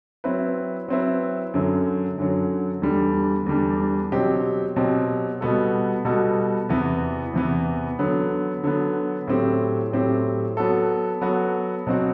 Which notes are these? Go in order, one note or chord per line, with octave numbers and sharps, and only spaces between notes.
F#3 C4 E4 B4
F#3 C4 E4 B4
F#2 D3 F#3
F#2 D3 F#3
E2 D3 G3 D4
E2 D3 G3 D4
B2 F#3 C4 G4
B2 F#3 C4 G4
B2 G3 B3 F#4 A4
B2 G3 B3 F#4 A4
E2 C3 E3 B3 E4
E2 C3 E3 B3 E4
D3 F#3 B3
D3 F#3 B3
A2 F#3 C4 G4
A2 F#3 C4 G4
F#3 B3 F#4 A4
F#3 B3 F#4 A4
B2 F#3 C4 F#4